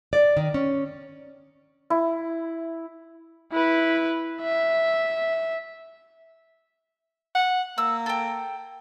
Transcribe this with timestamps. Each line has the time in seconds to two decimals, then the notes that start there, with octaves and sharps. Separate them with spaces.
0.13 D5
0.37 D#3
0.54 C#4
1.90 E4
3.52 E4 B4
4.41 E5
7.35 F#5
7.78 A#3 E6
8.06 A4 G5